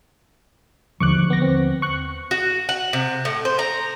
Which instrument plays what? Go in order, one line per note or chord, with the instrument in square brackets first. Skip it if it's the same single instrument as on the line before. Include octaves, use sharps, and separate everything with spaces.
[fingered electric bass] D#2 D3 F3 [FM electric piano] C#6 D6 F#6
[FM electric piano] B3 A#6
C4
C#6 F#6
[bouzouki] F#4
F#5
C3
A2
C5
A#5